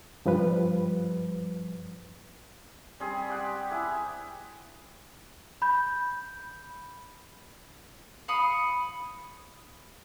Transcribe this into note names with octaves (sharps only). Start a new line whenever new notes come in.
G2 F3 G3 B4
G3 C4 G#4
G4 F#5
E4 G#4
B5 G6
F5 B5 C#6 D#6